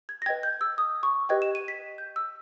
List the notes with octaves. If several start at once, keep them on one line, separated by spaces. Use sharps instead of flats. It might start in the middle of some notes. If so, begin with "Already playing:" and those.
G#6
A#6
B4 D#5 G5 G#6
G6
E6
D#6
C#6
G4 B4 D#5 G5 G#6
E7
D#7
B6
G6
E6